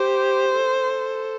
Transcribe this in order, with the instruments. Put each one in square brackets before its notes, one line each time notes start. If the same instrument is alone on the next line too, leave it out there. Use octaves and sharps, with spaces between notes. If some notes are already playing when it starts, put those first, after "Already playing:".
Already playing: [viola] G4 [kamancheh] C5
[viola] A4